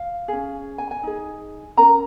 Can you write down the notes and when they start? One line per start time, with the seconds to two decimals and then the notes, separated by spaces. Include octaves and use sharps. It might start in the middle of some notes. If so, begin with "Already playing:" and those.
Already playing: F5
0.28 C#4 G#4
0.78 G#5
0.91 G#5
1.03 D#4 G#4
1.77 C#4 A#4 A#5